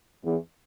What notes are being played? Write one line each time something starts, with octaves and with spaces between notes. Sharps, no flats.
E2